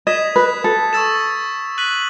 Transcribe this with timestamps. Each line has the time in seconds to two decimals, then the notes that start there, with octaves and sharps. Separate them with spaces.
0.07 D#5 D#6 G#6 B6 E7
0.36 B4
0.64 A4
0.93 C#6 E6 A6 E7
1.78 F#6 B6 D#7 F#7